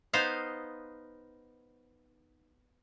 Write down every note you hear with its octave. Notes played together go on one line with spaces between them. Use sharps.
B3 D#4 C5 F5